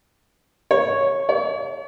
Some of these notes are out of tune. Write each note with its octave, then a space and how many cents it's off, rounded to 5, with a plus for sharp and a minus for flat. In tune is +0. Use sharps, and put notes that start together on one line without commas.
C#5 -5
C#5 +45